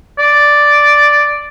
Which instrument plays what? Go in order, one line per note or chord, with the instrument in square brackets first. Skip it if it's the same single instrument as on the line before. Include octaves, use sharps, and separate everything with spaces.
[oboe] D5